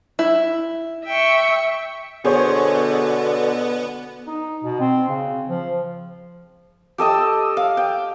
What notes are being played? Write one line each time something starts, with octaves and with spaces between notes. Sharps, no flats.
E4
E5 G5 C#6
B2 D3 B3 G#4 C5 C#5
D#4
B2
C4
C#3
F3
G4 A4 D#5 E6
F5
G5